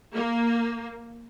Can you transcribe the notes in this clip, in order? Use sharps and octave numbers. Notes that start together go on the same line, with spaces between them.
A#3